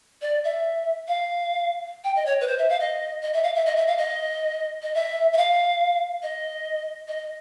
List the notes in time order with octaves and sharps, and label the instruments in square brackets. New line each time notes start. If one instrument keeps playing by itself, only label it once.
[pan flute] D5
E5
F5
G5
D#5
C#5
B4
C5
E5
F5
D#5
D#5
E5
F5
E5
D#5
E5
F5
D#5
D#5
E5
E5
F5
D#5
D#5